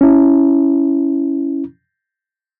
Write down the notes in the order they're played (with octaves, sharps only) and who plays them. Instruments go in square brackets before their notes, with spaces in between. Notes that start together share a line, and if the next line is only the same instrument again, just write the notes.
[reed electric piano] C#4 E4